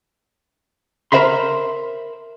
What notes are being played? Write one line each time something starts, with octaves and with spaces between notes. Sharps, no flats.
A#4 C5 E5 B5 C6